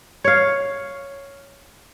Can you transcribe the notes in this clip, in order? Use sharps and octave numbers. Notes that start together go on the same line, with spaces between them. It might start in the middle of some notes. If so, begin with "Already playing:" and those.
C#5 F5